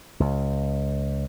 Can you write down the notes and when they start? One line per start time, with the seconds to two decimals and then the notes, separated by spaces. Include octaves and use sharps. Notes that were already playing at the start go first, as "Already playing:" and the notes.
0.20 C#2